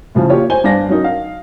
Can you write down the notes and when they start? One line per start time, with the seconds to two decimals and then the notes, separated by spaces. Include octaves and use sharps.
0.15 A2 C#3 F3
0.30 A#3 F4 G4 C#5
0.50 C5 G#5 G7
0.64 G2 D4 C5 F5 A#6
0.89 F#3 C#4 D#4 A#4
1.04 F5